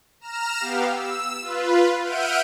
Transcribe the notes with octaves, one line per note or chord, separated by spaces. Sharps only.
A#5 F6 E7
B3 G4 F5
E6
F4 B4
E5 F#5 F6 G6 D7 D#7